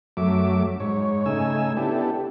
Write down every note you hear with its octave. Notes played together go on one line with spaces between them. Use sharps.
F#2 F#3 A3 E5 D6
G#2 C#5
C#3 A3 D#4 G#5 E6
B3 D4 E4 G4 A4